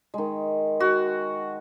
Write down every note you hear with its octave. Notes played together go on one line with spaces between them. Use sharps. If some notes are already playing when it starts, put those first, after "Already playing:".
D#3 G#3
F#4